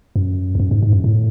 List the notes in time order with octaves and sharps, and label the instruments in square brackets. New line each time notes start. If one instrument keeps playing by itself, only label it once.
[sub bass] F#2
E2
F#2
G#2
G#2
F#2
A2